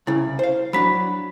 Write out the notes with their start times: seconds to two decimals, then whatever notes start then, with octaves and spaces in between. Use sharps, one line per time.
0.07 C2 C#3 E4
0.39 C5 F5
0.73 F#3 D4 B5 B6